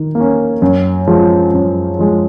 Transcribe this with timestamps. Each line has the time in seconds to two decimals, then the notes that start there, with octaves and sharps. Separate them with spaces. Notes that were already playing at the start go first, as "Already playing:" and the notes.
Already playing: D#3
0.15 A#3 C#4
0.62 F#2
1.07 F3 G#3
1.53 F#2
1.99 F3 G#3